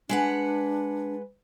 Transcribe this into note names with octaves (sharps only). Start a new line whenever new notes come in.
G#3 D4 B4 F#5